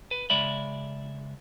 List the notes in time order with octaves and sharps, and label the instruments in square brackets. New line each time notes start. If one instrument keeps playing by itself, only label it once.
[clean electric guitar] B4
C#3 G#3 D5 E5 B5